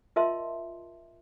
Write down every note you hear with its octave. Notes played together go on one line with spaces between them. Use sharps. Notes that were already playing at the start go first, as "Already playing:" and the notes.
F4 A#4 D#5 E5 A5 C6